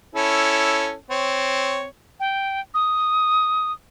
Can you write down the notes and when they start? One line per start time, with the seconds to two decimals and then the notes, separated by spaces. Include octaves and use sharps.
0.15 C#4 E4 A4
1.10 C4 C#5
2.20 G5
2.74 D#6